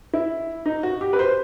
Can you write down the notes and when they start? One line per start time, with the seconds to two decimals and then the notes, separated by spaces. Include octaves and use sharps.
0.13 E4
0.66 D#4
0.83 F#4
1.01 G4
1.13 B4
1.19 C5